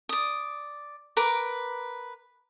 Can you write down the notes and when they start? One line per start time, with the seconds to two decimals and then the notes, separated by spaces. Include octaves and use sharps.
0.09 D5 D#6
1.17 A#4 B4 D6